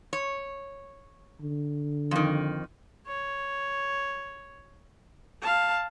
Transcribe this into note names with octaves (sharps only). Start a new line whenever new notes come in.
C#5
D3
F2 D#3
C#5
F5 A5